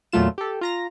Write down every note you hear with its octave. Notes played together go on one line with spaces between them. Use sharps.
E2 A#2 F#3 A3 F4 E7
G4 A4
F4 A#5 A#6